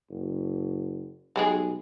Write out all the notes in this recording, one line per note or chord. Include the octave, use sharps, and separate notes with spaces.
F#1
B1 G3 G#3 G#4